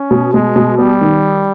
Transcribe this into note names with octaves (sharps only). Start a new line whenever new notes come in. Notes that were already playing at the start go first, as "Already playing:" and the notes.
Already playing: C#4
B2
B2 G#3
B2
G3 B3
D#3